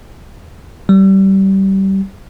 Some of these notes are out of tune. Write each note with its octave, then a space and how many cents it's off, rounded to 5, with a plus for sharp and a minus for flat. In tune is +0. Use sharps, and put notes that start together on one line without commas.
G3 -25